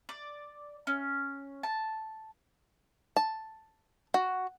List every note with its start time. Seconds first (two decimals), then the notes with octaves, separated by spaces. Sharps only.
0.09 D5
0.87 C#4
1.63 A5
3.17 A5
4.14 F#4